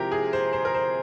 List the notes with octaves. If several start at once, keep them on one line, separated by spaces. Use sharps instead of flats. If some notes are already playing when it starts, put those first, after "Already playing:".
Already playing: C3 F3 G#3 E4 G4 A#4 C5
G#4
C5
C5
A#4
C5